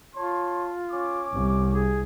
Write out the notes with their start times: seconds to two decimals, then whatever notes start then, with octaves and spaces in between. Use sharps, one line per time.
0.15 F4 C#5 A5 C6
0.91 C#4 D6
1.32 C2
1.72 G#4